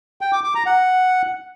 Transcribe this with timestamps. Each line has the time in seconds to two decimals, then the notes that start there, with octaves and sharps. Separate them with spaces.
0.21 G5
0.32 D6
0.44 D6
0.55 A#5
0.66 F#5